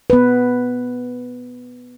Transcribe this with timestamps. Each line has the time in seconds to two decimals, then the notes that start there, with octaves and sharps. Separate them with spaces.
0.10 B3 B4